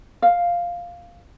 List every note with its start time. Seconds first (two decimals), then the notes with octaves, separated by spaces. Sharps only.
0.22 F5